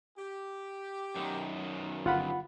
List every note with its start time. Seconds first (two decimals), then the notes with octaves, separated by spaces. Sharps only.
0.18 G4
1.16 F#2 D#3
2.06 G1 E3 F4 G4 B4 F#5 B5